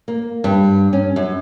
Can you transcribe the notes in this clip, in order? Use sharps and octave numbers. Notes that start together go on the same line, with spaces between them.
A#3
G2
C#4
F#2